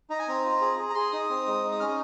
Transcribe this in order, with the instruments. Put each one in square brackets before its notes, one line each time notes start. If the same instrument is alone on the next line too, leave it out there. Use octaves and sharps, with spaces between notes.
[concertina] D#4 A#5
G#5
C4 A#5
F4
G#4
G#4
A#5
G#4 C6
D#4 D#6
C4
G#3
D#4
D#6
C#4 F6